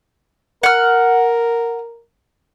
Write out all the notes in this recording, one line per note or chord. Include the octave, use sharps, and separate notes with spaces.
A#4 F#5 F6